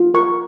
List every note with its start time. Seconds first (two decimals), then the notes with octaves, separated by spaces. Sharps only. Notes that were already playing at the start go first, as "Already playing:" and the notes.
Already playing: F4
0.14 A#4 C#6